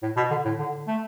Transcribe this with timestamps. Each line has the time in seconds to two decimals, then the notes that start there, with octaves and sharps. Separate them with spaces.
0.03 A2
0.17 B2
0.31 D3
0.45 A2
0.59 D3
0.87 A3